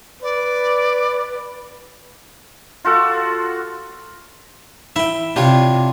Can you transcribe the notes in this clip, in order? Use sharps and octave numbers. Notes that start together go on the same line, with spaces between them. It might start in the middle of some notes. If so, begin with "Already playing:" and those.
B4 D5
F4 F#4 A4
E4 E5 G5
C3 D4 F4 G4 C#5